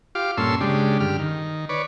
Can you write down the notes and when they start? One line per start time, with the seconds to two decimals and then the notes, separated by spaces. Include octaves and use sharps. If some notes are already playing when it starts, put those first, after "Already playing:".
0.15 F4 G4 F5 D6
0.37 G2 A#2 C#4 A4 C6 E6
0.61 C#3 G#3 D4 G4
1.00 G2 D3 G4 F6
1.19 D#3
1.69 B4 C#5 D5